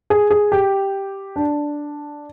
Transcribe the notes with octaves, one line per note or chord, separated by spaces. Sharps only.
G#4
G#4
G4
D4